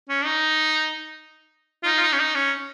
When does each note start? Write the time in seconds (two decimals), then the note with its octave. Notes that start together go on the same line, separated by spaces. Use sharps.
0.09 C#4
0.25 D#4
1.83 F4
1.86 D#4
1.98 F4
2.03 D#4
2.13 C#4
2.19 D#4
2.35 C#4